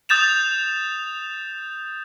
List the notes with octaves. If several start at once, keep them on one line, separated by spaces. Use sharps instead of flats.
D#6 G6 A6 E7 F7